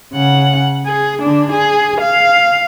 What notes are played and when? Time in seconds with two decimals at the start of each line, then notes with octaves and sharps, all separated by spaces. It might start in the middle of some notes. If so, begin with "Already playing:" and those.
0.13 C#3 F#5
0.86 G#4
1.22 D3 D4
1.52 G#4
2.01 F5